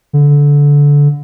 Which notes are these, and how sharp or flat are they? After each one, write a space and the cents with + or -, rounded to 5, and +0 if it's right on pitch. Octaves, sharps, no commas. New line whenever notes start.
D3 -20